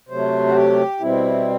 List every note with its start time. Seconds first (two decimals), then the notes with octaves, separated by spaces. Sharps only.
0.09 C3 F#3 A3 C5
0.48 F#4
0.54 G4
1.00 B2 G3 C4 E4